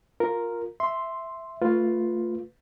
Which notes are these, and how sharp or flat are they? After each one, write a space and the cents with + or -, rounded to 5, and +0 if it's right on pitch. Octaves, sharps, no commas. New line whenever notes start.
F4 +15 A#4 +0
E5 +0 C6 +0
A3 +25 F4 +5 B4 +0